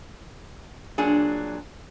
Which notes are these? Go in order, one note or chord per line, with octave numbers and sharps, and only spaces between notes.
A#2 F#3 D4 G#4